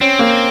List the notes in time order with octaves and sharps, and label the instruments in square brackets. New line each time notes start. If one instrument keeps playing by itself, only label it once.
[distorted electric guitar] C4 [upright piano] C#4
[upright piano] A#3